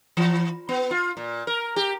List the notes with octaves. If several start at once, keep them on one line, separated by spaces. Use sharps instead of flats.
E3
B3
F4
A#2
A#4
G4